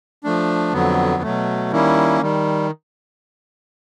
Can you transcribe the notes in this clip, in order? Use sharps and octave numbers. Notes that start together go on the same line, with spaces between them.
F3 A3 D4
F2 D3 F#3 B3
B2 F#3 A3
D#3 G3 A#3 C#4 E4
D#3 G3